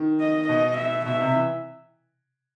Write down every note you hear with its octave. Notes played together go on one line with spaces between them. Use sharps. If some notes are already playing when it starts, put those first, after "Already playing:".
Already playing: D#3
D#5
B2 D#5
E5
B2 E5
C3
E3